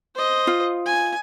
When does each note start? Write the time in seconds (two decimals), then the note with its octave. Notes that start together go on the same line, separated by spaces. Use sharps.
0.15 C5 D#5
0.47 F4
0.86 G#5